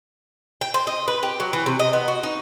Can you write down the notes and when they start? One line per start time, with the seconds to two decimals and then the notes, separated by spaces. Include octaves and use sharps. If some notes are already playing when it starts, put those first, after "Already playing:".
0.61 G5
0.74 C5
0.87 D#5
1.08 B4
1.23 G4
1.40 F#3
1.53 E3
1.66 C3
1.79 D#5
1.93 B3
2.08 F#4
2.23 D#4